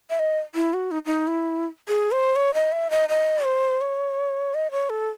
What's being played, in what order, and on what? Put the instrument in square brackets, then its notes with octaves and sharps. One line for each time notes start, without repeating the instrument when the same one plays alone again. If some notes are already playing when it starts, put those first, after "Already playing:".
[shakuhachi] E5
D#5
E4
F#4
D#4
D#4
E4
G#4
C5
C#5
D#5
E5
D#5
D#5
C5
C#5
D#5
C#5
A4